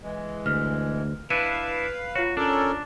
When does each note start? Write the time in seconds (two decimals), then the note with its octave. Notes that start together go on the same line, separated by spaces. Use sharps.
0.03 E3 G#3
0.46 D2 F6
1.30 D4 E4 B4 F5 C#7 D#7 E7
2.15 F4 F#4 C#5
2.37 C#4 D4 A4 A#4